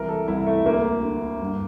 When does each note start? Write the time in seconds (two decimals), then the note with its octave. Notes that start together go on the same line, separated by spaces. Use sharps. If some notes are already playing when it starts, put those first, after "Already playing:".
Already playing: C2 E3 A#4
0.09 A4
0.28 C2 E4
0.46 A3
0.65 D2 A#3
1.03 D3
1.41 G2